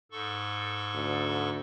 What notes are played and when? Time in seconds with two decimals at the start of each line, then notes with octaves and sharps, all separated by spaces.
0.11 G#2 A4 C#6
0.94 D2